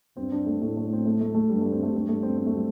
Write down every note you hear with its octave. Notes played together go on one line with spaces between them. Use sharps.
G2 C4
D4
A3
A2 A3
A3
C4
A3
A3
A3
G2 G3
A3
C4
A3
G2 G3
A3
C4
C4
A3
G3